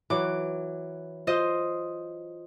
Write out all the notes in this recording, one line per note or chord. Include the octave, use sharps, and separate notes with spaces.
E3 F#3 D6
F4 C5 D#5